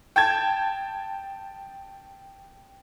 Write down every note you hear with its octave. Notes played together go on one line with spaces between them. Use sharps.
G5 A5 G#6